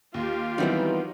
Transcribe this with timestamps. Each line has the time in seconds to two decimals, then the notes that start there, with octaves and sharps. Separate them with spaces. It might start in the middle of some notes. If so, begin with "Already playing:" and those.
0.14 D#2 F4 G4
0.58 D#3 E3 F#3 G3 B3 C4 D#4